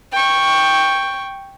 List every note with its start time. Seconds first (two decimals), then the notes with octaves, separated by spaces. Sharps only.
0.12 G5 C#6